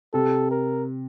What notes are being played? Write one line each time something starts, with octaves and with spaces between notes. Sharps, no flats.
C3 A4
A#4